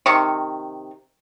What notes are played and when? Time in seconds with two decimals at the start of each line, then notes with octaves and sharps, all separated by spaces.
0.06 C3 D#3 C#6